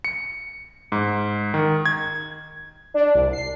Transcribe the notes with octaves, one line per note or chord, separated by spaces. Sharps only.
C#7
G#2
D#3
G#6
D4
C2
C7